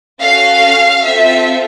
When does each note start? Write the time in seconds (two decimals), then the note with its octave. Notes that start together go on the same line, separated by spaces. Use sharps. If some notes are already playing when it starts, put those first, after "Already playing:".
0.21 C#4 F#4 A4 F5
1.05 C4 F4 A4 E5